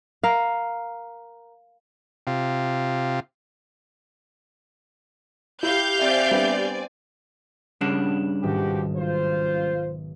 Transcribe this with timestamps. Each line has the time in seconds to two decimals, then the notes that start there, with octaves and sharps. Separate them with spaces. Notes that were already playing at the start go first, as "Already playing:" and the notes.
0.23 A#4 F5
2.27 C3 F4
5.63 E4 G4 F5 G6
5.99 C4 D5 E5 G#5
6.31 G3 B3 D4
7.81 G2 C#3 D4 F#5
8.43 B1 G#2 D#3 F3 F#4 G4
8.96 F4 C5